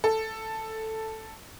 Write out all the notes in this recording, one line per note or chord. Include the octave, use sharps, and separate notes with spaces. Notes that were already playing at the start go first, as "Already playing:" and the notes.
A4